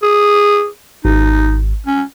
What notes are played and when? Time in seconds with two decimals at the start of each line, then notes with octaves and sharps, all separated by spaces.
0.03 G#4
1.05 G#1 D#4
1.86 C#4